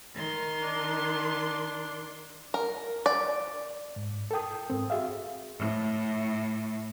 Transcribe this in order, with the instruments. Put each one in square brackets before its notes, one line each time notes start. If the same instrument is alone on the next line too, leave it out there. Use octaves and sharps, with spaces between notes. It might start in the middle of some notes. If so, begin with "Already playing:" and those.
[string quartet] D#3 C6
[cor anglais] D4
[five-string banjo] A#4
D5
[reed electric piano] G#2
A4 A#4 G5 D#6
G#2 C4
F#4 G#4 E5 F5
[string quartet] A2